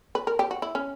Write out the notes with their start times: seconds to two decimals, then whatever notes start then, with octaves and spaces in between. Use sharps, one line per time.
0.15 B4
0.27 A#4
0.39 G4
0.51 F#4
0.62 E4
0.75 C#4